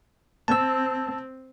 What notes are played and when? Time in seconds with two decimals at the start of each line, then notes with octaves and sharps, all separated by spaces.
0.48 C4 A5 E6